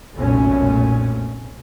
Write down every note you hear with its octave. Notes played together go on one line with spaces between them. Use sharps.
F1 B1 F#2 A#2 A3 C#4